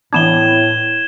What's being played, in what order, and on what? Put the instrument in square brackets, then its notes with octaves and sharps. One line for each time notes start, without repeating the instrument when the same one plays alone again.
[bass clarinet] A2 [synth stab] E3 B3 D4 [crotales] G#6 E7 G7